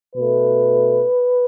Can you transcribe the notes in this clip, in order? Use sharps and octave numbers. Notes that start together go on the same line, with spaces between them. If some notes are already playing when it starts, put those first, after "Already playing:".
B2 A3 B4